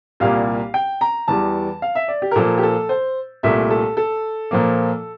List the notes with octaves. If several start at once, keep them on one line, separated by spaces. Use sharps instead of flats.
C2 A#2 G3 A#3 F5
G5
A#5
E2 E3 G3 A5
F5
E5
D5
G4
A#4
A#2 F3 A#3 A4
G4
A4
C5
C2 A#2 A3 E5
A4
A4
A#2 F3 A#3